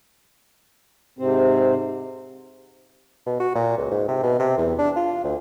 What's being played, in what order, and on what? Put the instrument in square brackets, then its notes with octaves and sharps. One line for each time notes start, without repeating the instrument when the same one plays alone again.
[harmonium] G#2 C3 C4
[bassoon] B2
F#4
A#2
C#2
G#2
C3
B2
C3
E2
D4
F4
D2